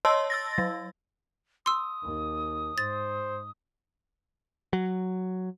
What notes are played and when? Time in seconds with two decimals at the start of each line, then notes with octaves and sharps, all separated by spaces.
0.05 C#5 D#5 A5 C6 E6
0.30 E6 A6 A#6
0.58 F#3
1.66 C6 D#6 E6
2.04 D#2
2.78 G#2 C5 A6
4.73 F#3